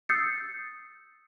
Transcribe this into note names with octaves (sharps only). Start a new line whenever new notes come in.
D#6 E6 G6 A6 C7 C#7